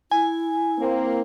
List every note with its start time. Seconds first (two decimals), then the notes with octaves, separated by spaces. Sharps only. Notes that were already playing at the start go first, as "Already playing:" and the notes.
0.11 E4 G#5
0.78 A#3 C4